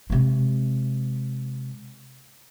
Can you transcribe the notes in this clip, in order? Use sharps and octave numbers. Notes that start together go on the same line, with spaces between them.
C3 G#3